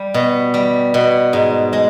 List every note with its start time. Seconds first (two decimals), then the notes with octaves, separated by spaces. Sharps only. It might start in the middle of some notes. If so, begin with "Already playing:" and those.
Already playing: G3
0.14 B2
0.54 G3
0.94 B2
1.33 G#2
1.73 G#3